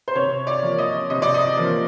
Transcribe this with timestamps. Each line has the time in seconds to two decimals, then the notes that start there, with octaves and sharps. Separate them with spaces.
0.08 C5
0.15 C3 C#5
0.47 D5
0.63 F3 A#3
0.78 D#5
1.10 C3 D#5
1.22 D5
1.34 D#5
1.57 F3 A#3